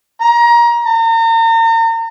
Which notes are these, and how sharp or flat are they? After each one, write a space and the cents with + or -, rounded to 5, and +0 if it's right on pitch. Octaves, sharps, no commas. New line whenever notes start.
A#5 +25
A#5 -40